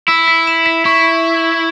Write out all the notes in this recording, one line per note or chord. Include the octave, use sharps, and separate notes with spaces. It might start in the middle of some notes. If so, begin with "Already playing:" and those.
E4 E6
B6
E7
B6
E4 C#6